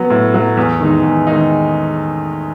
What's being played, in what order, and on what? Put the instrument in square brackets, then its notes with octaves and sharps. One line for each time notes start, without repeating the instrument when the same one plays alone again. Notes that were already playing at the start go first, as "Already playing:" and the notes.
Already playing: [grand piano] F#3 B3
A2
F#3 B3
E2
D#3 G#3 D#4
E2
D#3 G#3 D#4